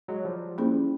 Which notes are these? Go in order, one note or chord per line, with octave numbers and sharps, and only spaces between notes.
F#3 G#3
F3 G3
A#3 C#4 E4 G#4 C5